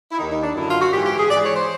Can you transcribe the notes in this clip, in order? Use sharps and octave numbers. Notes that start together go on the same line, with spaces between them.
E4
D#2 D#3 D#4
D#4
D4
F#2 D3 E4
F4
F#4
G#2 E3 G4
G4
G#4
G#2 E3 D5
C#5
C5